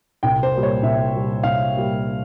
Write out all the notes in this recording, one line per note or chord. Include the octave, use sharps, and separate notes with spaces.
C2 G5
C5
A#2 G3
C#5
C2 E5
A#2 G3
C2 F5
A#2 G3